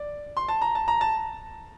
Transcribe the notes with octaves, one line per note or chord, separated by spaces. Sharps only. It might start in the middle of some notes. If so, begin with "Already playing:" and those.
Already playing: D5
C6
A5
A#5
A5
A#5
A5